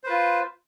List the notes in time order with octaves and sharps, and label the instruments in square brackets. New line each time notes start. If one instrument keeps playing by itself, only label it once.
[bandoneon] C5
B4
F4